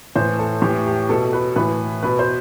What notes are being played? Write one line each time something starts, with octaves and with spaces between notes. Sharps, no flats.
A2 E3 C5
A4
A2 E3 G4
G4
B2 A4
B4
A2 E3 B4
B2 B4
C5